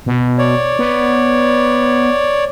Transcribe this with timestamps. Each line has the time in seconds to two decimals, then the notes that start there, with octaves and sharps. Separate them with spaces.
0.06 B2
0.38 C#5 D5
0.79 B3